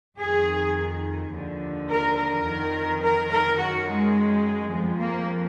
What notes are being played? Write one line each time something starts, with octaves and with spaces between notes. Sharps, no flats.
F2 D#3 G#4
D#2 D3 F3
A#4
A#4
F2 D#3
A#4
A#4
F#2 D#3 F#4
G#3
F2 F3 G#3
A#3